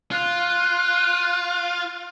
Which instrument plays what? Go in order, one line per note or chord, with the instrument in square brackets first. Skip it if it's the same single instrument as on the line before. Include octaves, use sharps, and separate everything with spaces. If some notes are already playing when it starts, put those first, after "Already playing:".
[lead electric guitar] F4 [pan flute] F#6